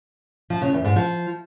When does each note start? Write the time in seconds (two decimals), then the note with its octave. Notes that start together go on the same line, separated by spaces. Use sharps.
0.50 F3
0.62 C#3
0.73 E2
0.85 G#2
0.96 F3